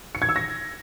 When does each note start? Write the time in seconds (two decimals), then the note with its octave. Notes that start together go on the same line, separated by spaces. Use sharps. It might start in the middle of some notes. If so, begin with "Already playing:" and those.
0.15 C#7
0.22 G#6
0.29 E6
0.36 A#6